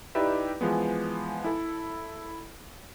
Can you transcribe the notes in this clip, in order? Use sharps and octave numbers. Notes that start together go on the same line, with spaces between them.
D#4 E4 G4 B4 D5 E5
E3 F3 G#3 B3
E4 A4